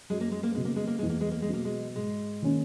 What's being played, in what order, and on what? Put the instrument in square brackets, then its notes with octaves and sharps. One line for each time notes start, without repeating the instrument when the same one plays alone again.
[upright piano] F#2 [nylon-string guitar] G#3
[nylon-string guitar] A#3
G#3
A#3
[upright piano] C#3 F#3 B3 [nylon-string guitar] G#3
[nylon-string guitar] A#3
G#3
A#3
[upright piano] E2 [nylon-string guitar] G#3
[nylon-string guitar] A#3
G#3
A#3
G#3
[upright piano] B2 F#3 [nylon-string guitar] A#3
[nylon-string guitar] G#3
[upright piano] G#2 [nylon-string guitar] G#3
[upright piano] D#3 A#3 C#4